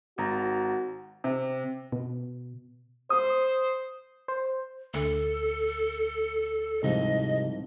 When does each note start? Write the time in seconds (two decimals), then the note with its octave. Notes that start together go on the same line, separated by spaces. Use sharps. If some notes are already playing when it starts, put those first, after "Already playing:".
0.18 G#1 F#4 A#5
1.24 C3
1.92 B2
3.10 C5 D#6
4.28 C5
4.94 D2 A4
6.83 C2 G#2 C3 F3 D#5